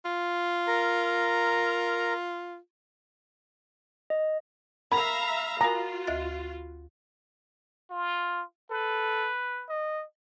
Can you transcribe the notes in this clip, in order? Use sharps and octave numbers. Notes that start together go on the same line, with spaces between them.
F4
A#4 A#5
D#5
A#4 E5 F5 A#5 B5
F4 F#4 A#4 F5 G#5 A#5
D2 E5 A6
F4
A4 B4
D#5